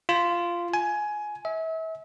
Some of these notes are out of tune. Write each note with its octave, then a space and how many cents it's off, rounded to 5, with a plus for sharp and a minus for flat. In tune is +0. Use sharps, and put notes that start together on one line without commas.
F4 -10
G#5 +15
E5 -35